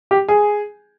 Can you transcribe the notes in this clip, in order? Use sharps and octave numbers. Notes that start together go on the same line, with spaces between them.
G4
G#4